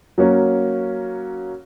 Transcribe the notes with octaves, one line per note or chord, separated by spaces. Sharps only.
F#3 A#3 C#4